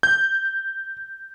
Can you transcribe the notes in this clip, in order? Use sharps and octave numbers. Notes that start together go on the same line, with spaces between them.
G6